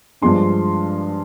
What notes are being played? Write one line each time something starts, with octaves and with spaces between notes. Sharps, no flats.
G2 F3 G#3 D4 C6